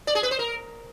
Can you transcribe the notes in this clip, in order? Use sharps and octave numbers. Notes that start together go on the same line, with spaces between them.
D5
G#4
B4
C5
A#4